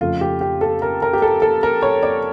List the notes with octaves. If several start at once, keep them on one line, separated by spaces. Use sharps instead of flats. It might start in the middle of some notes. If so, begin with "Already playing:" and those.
F2 C#3 F3 A3 F4
G4
G4
A4
A#4
A#4
G4
A4
A4
A#4
C#5
D5